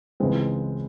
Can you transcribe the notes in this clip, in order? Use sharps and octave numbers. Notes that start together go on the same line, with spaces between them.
C#2 C#3 E3 G#3 C4